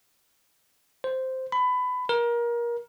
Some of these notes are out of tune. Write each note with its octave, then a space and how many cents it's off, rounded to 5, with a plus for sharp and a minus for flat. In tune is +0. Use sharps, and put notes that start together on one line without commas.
C5 -5
B5 +20
A#4 +25